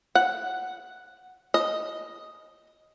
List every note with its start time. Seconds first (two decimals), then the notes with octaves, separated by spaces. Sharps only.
0.15 F#5
1.54 D#5